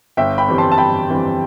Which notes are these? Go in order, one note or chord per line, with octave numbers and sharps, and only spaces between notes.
G1 E5 G5
G5 B5
F2 E3 G3
A5 C6
A5
G1 G5 B5
F2 E3 G3